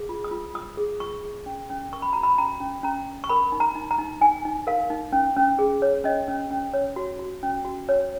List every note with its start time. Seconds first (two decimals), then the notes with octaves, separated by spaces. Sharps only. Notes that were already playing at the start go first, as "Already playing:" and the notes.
Already playing: G#4
0.09 F4
0.24 D#6
0.31 F4
0.54 F4 D#6
0.77 G#4
1.00 F4 C#6
1.23 G#4
1.46 C#4
1.70 C#4
1.92 A#4 C#6
2.02 B5
2.13 F#4 A#5
2.23 B5
2.38 C#4 A#5
2.60 C#4
2.83 C#4 A#5
3.07 C#4
3.24 C#6
3.29 A#4 B5
3.52 D#4
3.60 A#5
3.76 D#4
3.91 A#5
3.99 D#4
4.21 D#4 G#5
4.45 D#4
4.67 A#4 F5
4.90 D#4
5.12 C#4
5.37 C#4
5.59 G#4
5.82 C#5
6.04 C#4 D#5
6.28 C#4
6.51 C#4
6.74 C#5
6.96 F#4
7.19 F#4
7.43 C#4
7.65 F#4
7.88 C#4 C#5